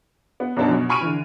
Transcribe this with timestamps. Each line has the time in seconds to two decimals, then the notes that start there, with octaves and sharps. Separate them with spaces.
0.40 B3
0.56 F#2 B2 B3 D4 D#4 A5
0.68 B2 F#3
0.89 G#5 B5 C#6 F6 D7 D#7
1.01 D3 E3